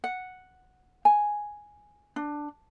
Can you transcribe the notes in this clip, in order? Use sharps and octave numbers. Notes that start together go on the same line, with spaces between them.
F#5
G#5
D4